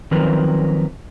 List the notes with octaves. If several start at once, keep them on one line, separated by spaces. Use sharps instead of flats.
D#3 F3 F#3 C4 A#4 B4